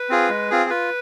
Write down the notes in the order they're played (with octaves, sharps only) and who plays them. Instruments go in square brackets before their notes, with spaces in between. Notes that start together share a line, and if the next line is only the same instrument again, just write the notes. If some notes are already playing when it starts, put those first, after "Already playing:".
Already playing: [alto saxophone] B4
[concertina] C4 F4 G#4
G#3
C4 F4 G#4
[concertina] F4 [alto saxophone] B4